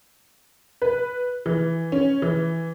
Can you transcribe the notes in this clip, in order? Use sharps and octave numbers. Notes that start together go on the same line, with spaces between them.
B4
E3
C#4
E3